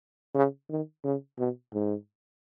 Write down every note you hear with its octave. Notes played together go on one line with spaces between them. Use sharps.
C#3
D#3
C#3
B2
G#2